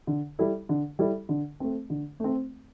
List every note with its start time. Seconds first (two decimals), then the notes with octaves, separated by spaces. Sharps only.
0.07 D3
0.39 G3 E4 A4
0.69 D3
0.99 G3 E4 A4
1.29 D3
1.60 A3 C4
1.90 D3
2.20 A3 C4